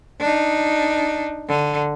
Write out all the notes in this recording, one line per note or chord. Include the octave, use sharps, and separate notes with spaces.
D4 D#4
D3